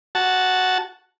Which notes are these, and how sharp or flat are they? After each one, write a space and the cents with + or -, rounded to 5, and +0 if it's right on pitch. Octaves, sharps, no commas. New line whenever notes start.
F#4 +0 A5 -5